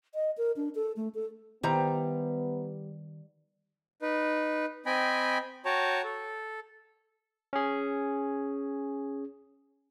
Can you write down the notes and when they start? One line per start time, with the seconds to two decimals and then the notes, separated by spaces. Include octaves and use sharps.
0.15 D#5
0.38 A#4
0.56 D4
0.75 A4
0.96 A3
1.15 A4
1.64 D#3 G3 B3 E4 C5 A#5
4.02 D#4 B4
4.86 C4 D#5 G5 G#5 B5
5.65 F#4 C#5 G5 A5 A#5
6.04 A4
7.53 C#4 G#4